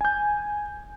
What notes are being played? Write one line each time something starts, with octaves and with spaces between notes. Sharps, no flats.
G#5 G6